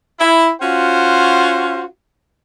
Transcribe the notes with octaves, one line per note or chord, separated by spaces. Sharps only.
E4
C#4 F4 F#4 C5 F#5